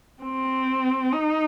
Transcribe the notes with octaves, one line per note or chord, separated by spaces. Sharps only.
C4
D#4